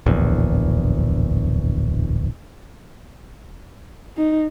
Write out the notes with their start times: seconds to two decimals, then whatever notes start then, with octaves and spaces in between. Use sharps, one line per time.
0.06 D1 A#1 E2
4.16 D#4